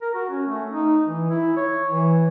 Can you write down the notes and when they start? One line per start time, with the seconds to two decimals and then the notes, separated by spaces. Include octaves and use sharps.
0.02 A#4
0.15 F#4
0.30 C#4
0.47 A3
0.70 D#4
1.06 E3
1.30 E4
1.57 C#5
1.90 E3